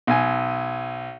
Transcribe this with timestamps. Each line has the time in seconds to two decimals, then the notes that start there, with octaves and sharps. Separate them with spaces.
0.07 B1 G#5